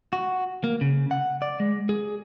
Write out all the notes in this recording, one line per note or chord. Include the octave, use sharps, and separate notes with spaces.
F#4
A#3
C#3
F#5
D5
G#3
G#4